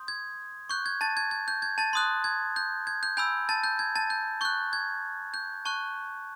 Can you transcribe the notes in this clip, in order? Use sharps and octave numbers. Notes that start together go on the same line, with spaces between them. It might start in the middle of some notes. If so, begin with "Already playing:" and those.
Already playing: C6 D#6 G6
G#6
C#6 F#6 G6
G#6
A5 A6
G#6
G#6
G6
G#6
A5 A6
C6 D#6 F#6
G#6
G6
G#6
G6
G#5 B5 E6 G6
A5 A6
G6
G#6
A5 A6
G6
C#6 F#6 G6
G#6
G6
A5 C#6 F#6